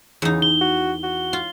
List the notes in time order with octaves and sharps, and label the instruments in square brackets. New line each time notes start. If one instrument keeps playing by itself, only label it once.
[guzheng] E2 D#4 [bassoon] C#3
[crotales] G7
[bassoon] F#4
F#4
[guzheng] F4